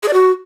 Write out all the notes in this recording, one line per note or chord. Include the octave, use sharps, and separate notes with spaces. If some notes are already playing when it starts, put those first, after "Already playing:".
G#4
D5
F#4